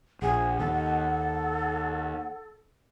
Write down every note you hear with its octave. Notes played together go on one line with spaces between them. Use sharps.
A#1 G#4 F#5
D#2 A4